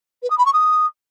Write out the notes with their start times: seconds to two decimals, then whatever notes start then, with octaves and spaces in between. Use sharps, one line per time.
0.23 B4
0.30 D#6
0.38 B5
0.46 C#6
0.53 D#6